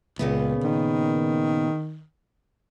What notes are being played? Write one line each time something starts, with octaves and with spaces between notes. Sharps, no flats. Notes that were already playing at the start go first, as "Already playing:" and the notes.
C#2 A#2 C#3 B3
D#3